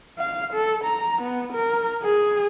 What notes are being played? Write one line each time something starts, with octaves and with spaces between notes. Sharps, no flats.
F5
A4
A#5
B3
A#4
G#4